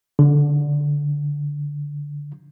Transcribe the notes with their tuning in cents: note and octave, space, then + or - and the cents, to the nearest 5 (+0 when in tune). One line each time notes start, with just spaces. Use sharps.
D3 -10